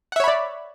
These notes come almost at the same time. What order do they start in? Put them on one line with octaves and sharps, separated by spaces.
F#5 E5 C#5 B5 D5